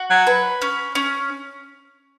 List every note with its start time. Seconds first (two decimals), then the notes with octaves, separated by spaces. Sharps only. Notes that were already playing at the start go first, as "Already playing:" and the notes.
Already playing: F#4
0.10 F#3
0.27 B4
0.62 C#4
0.95 C#4